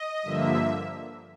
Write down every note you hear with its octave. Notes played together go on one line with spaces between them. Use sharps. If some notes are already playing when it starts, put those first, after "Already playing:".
Already playing: D#5
G2 D3 F3 A#3 E5